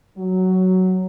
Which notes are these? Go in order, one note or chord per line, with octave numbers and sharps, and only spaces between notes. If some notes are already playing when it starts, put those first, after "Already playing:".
F#3